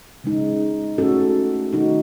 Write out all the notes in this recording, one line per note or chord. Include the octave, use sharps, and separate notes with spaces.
C#3 G#3 D#4
A3 C#4 F#4 A4
D#3 A3 D#4 F#4